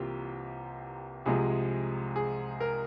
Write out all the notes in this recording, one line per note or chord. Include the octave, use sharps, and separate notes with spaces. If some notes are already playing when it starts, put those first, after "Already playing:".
Already playing: C2 C3 E3 A#3 F4 G4
C2 C3 F3 G#3 G#4
G#4
A#4